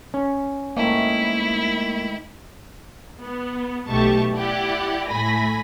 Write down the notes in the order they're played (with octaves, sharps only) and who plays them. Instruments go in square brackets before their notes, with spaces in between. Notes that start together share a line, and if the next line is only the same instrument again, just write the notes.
[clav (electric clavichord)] C#4
[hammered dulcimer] G#2 D#3 A3 [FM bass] A#3 [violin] E4
[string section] B3
B1 B2 A3 G4 A5 C#6
E4 G4 D5 F#5
A2 A3 G#5 B5 A#6